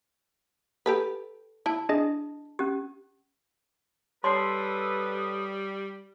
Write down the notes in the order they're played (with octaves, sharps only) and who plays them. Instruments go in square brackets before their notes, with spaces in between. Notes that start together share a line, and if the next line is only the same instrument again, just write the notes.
[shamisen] G4 A4 B4
[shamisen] E4 [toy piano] A5
[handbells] D4 G#4 D#5
[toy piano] C#4 G4
[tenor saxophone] G3 [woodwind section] A4 B4 D#6 [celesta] C#5 A5 C7 [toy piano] C6